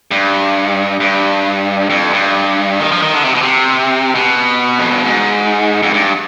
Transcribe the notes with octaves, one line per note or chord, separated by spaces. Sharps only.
G2
G2
F2
G2
D#3
F3
D#3
D3
C3
B2
C3
B2
F2
G2
G#2
F2
G2